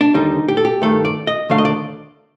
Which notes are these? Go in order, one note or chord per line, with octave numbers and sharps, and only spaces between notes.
D4
D#2 D3 G3 D#4
G4
A4
G4
G2 D#3 A3 A4
D5
D#5
D#2 D3 A3 D4 F5
D#5
D5